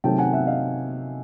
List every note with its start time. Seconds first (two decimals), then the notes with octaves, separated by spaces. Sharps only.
0.04 C3 D#3 F#3 A3 G5 A5
0.18 F#5 G#5
0.33 E5 F#5
0.47 D#5 F5